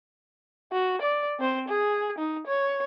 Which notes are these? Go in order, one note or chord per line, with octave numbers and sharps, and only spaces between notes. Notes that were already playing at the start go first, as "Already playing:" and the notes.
F#4
D5
C4 C5
G#4
D#4
C#5